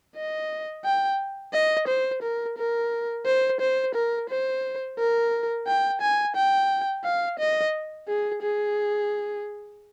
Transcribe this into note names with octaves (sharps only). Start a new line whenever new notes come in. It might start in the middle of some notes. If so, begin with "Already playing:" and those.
D#5
G5
D#5
C5
A#4
A#4
C5
C5
A#4
C5
A#4
G5
G#5
G5
F5
D#5
G#4
G#4